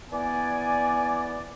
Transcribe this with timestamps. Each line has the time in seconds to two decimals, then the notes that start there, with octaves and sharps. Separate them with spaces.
0.11 E3 B3 D5 G#5